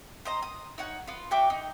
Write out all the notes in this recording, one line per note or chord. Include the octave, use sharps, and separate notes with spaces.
C5 D#5 A#5
D#6
D#4 C#5 F#5
B3 F4
F#4 E5 G5 D6
D#4